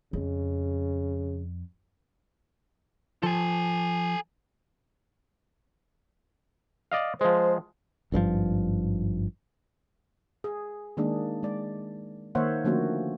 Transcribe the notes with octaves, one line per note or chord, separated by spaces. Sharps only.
F2 C#3
F3 A4 G#5
D5 D#5 F5
F3 G#3 C5
G#1 G2 C#3 F3
G#4
D#3 G#3 A#3 D4 G#4
G#3 D5
D#3 A#3 C5 C#5 E5 F#5
D3 F3 A3 A#3 C#4 F#4